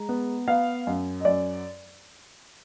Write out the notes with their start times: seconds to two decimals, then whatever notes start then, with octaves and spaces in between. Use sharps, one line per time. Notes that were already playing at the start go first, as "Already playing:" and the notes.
Already playing: G#3 A#5
0.09 B3
0.48 B3 F5
0.87 F#2
1.20 D#5
1.25 F#2 D5